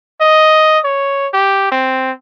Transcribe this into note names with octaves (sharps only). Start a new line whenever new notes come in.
D#5
C#5
G4
C4